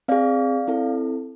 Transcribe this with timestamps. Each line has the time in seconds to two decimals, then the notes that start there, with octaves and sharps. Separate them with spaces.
0.08 C4 G#4 D5 F5
0.67 C4 E4 A4